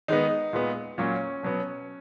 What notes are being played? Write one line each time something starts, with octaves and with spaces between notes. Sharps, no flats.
D#3 G#3 B3 D#4
A#2 G#3 B3
A#2 F#3 A#3 C#4
B2 F#3 B3